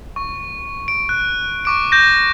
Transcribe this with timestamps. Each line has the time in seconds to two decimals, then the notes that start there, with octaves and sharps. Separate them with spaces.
0.16 C#6
0.88 D7
1.09 F#6
1.65 C#6 D6 D7
1.92 G6 A#6